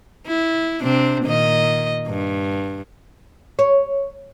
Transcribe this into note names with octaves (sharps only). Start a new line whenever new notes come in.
E4
C3 C4 D4
A#2 D#3 D#5
G2
C#5